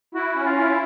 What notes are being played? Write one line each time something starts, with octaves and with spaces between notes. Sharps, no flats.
E4 F#4
C#4
F4
E4